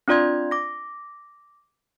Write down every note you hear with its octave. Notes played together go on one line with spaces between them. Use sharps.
C4 D4 F4 D5 C6 G#6
D6 A#6